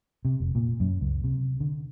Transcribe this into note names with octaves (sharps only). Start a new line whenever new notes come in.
C3
F1
A#2
F#2
C#2
C3
D3